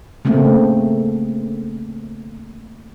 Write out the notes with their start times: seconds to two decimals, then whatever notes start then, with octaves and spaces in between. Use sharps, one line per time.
0.25 C#3 A3 A#3 C4